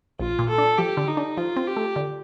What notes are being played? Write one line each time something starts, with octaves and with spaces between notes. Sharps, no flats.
A#1 F4
A#2
A4
D4
F3 G4
D3
D#4
D4
F3 F4
C4
G4
A3
D3